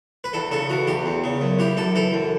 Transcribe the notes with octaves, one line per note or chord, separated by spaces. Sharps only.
B4
E2 A4
C#3 A4
E3 F#4
E2 G4
E2
C#3
F#2
E3 G4
F#2 A4
E3 A4
F#2